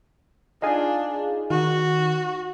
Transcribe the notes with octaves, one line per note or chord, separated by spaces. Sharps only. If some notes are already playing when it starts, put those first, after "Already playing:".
D4 D#4 F4 G#4
D#3 F#4